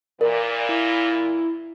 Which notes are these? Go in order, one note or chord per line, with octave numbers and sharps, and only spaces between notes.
A#2 E3 A#4 D5
E4